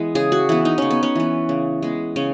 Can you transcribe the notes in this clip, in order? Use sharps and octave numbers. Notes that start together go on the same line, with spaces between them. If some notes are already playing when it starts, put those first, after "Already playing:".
Already playing: E3 G#3 B3
C#3 G#4
F#4
E3 B3 E4
D#4
C#3 C#4
B3
C#4
E3 B3
C#3
G#3 B3
C#3 C#4